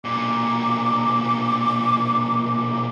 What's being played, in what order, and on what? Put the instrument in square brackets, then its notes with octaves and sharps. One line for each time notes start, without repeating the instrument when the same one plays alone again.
[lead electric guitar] B1 A#2 [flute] D6